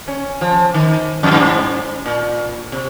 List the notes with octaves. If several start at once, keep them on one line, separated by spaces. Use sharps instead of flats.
C#4
F3
D#3
F2
G2
G#2
A#2
C3